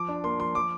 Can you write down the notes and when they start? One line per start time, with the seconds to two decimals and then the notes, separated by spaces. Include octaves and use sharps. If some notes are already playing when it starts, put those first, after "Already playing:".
Already playing: F3 D6
0.08 D4
0.24 A#3 C6
0.39 F3 C6
0.55 F3 D6